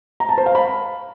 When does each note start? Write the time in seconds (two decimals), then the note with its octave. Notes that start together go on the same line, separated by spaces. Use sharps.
0.20 A#5
0.29 A5
0.38 C5
0.46 F5
0.55 B5